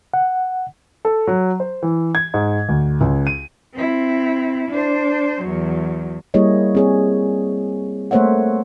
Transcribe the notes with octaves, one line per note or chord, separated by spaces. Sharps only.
F#5
A4
F#3
C5
E3
G#6
G#2
D2
C#2
D#7
C4 E4
D4 C5
E2 F#3
G3 A#3 E4 G#4 C#5 D#5
C4 G#4 C#5
A3 A#3 C5 C#5 E5 F#5